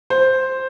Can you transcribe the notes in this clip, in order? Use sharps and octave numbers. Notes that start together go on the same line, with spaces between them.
C5